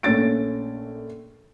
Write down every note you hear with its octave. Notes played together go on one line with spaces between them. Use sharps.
A#1 A3 C#4 A6 D7